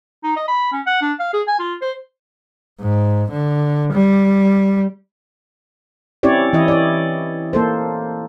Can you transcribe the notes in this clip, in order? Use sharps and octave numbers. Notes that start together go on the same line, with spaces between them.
D#4
D#5
B5
C#4
F#5
D4
F5
G#4
G#5
F4
C5
G#2
D3
G3
C4 C#4 E4 G4 C#5 D5
E3 E4 D#5
C#5 D5
A#3 A4 C5